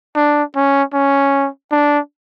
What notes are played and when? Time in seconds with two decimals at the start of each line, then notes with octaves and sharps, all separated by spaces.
0.16 D4
0.56 C#4
0.94 C#4
1.72 D4